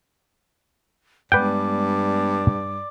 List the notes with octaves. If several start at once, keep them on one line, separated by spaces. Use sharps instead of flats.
G2 G#3 B3 B4 D5 F#5 G5 D6